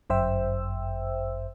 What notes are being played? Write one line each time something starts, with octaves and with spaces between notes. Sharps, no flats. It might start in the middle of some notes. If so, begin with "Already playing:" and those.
G1 F#2 C5 E5 G5 E6